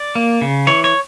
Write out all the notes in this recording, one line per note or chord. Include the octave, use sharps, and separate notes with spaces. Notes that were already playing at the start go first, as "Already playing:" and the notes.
Already playing: D5
A#3
C#3
E3 C#5
C#5